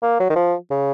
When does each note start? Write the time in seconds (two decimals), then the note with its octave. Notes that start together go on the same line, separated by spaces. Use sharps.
0.03 A#3
0.20 F#3
0.30 D#3
0.36 F3
0.71 C#3